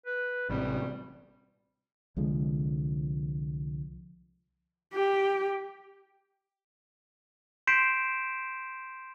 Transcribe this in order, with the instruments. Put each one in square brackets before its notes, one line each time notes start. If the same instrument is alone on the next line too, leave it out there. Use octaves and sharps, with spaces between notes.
[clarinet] B4
[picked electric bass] A1 C3 [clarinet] G3
[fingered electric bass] C2 D3 F3 G#3
[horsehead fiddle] G4
[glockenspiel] C6 G6 B6 C7 D7 E7